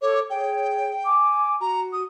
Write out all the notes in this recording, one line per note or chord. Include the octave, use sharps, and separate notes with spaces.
A4 C#5 D6
G#4 C#5 G5
G#5 D6
F#4 A#5
D#6